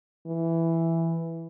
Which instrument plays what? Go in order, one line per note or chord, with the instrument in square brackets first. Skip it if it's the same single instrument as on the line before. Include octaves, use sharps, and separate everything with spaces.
[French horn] E3